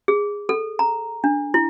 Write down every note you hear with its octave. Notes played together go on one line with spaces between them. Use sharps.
G#4
A4
A#5
D4
E4